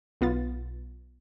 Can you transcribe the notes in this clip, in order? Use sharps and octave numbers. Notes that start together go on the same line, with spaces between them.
B1 B3 F4 A6